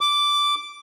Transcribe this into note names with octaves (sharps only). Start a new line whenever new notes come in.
D6